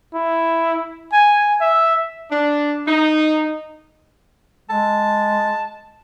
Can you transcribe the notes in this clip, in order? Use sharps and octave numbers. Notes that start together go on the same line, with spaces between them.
E4
G#5
E5
D4
D#4
G#3 A5